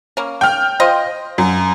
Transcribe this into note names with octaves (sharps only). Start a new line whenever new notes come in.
A#3 C#4
G5 F6
F4 C5 D#5
F#2